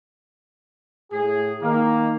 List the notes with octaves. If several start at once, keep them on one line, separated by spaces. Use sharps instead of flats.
A2 G#4
D#3 A#3